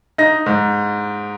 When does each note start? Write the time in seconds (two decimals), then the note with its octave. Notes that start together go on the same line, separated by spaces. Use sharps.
0.18 D#4 A#6
0.46 G#2